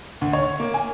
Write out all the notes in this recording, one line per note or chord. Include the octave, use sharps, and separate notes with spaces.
D2
C#5
A#3
G#5